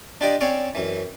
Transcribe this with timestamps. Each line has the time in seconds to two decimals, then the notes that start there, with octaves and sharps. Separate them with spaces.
0.21 D4 F4 G4 D5 D#5
0.41 C4 C#4 C#5 D5 F5
0.75 F#2 E3